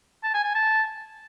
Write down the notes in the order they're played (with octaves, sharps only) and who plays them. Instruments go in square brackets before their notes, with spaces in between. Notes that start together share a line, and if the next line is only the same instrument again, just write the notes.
[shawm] A5
G#5
G#5
A5